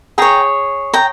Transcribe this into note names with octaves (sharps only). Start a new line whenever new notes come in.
G#4 C#5 G5 A#5
G5 A#5